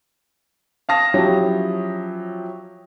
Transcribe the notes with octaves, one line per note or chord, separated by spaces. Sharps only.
F5 A5 D#6 A#6
F3 F#3 C#4 E4 G4